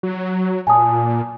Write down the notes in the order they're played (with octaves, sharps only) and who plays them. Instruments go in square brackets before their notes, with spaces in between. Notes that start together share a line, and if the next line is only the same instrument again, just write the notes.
[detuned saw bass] F#3
[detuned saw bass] A#2 [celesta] G#5 A5 D#6